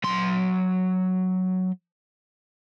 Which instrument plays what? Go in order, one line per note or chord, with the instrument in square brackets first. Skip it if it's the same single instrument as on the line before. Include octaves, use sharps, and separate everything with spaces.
[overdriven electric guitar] F#3 C6